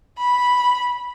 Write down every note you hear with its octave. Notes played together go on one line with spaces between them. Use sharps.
B5